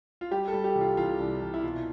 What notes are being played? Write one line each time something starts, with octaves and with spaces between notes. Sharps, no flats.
F4
G3 G4
A4
G3
G4
C2
F4
C2 F4
C2
C2
E4
B2 F4